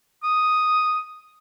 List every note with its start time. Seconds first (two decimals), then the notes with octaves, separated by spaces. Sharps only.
0.24 D#6